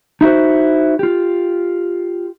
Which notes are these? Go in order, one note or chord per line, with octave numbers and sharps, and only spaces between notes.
D#4 E4 F#4 C5
F4 G4